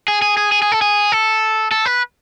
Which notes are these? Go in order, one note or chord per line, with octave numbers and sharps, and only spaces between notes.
G#4
G#4
G#4
G#4
G#4
A4
G#4
A4
A4
B4